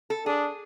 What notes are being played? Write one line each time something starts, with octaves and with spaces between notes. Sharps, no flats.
A4
D4 G#4